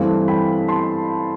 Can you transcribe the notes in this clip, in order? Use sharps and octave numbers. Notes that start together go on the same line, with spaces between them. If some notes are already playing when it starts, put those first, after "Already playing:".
Already playing: G2 E3 A3 C4 F5
G5 B5
A5 C6